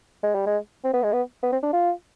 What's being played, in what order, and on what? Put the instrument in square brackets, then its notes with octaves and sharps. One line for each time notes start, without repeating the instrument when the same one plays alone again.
[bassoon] G#3
G3
G#3
C4
B3
G#3
B3
B3
C4
D4
F4